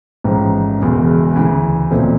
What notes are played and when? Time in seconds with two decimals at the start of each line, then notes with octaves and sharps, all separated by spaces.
0.24 A1 G#2 F3
0.79 E1 E2 C#3
1.36 D2 C#3 E3
1.91 B1 A#2 F3 A3 C4